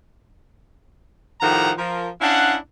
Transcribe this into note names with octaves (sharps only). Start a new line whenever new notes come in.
A2 D#3 F3 G4 F#5 A#5
F3 A#4
C#4 D4 E4 F5 F#5